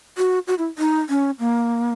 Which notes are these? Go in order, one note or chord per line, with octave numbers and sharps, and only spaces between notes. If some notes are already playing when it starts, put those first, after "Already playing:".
F#4
F#4
E4
D#4
C#4
A#3